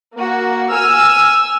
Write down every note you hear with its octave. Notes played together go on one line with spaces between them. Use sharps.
A#3 F#4
G#5 E6 F6